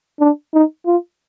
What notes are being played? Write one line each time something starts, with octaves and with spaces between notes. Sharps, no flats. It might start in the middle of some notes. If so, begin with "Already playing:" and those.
D4
D#4
F4